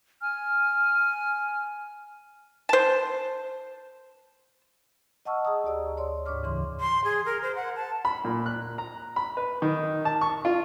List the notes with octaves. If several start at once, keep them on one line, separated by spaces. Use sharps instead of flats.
G#5 F6
C5 A5
D#5 F#5 A5 C#6 E6 F6
G#4 D#5 F#5 A#5 D#6
D2 G4 D5 E6
C#5 D5 C6
D2 G#2 C#5 C#6 D6 F6
E2 C#3 E3 C6
C6
G#4
A#4
C5
F#5
A5
B5
A#2
F#6
A#5
B5
B4
D#3
A5
C#6
F4